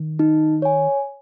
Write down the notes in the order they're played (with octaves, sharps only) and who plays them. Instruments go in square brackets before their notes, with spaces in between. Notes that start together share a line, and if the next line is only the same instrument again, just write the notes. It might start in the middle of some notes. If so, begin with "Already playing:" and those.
Already playing: [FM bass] D#3
[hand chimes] D#4
C#5 G#5